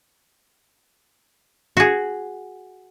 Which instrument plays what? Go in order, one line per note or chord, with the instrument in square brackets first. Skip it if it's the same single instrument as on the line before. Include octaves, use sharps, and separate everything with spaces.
[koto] F#4 G#4